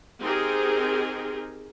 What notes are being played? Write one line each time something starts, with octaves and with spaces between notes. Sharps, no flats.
C4 D#4 G4 G#4 A#4